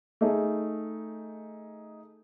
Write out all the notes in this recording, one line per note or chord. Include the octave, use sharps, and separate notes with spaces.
A3 D#4 G#4